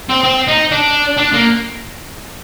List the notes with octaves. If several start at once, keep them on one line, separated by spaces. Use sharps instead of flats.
C4
C4
D#4
D4
D4
A#3